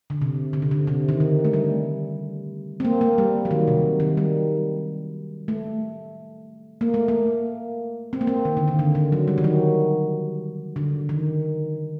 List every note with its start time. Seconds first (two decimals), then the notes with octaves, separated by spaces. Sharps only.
0.10 D3
0.21 C3
0.53 D3
0.62 C3
0.71 D3
0.87 C3
1.09 D#3
1.20 D3
1.45 A3
1.53 G3
2.80 C4
2.85 A#3
3.01 A#3
3.18 G3
3.45 F#3
3.51 D#3
3.68 C3
4.00 D#3
4.17 G3
5.48 A3
6.81 A#3
6.94 A3
7.08 A#3
8.13 C4
8.21 A#3
8.27 C4
8.45 D#3
8.57 D3
8.68 D#3
8.79 D3
8.95 D3
9.12 F#3
9.28 G3
9.38 D#3
9.44 F#3
10.76 D3
11.09 D#3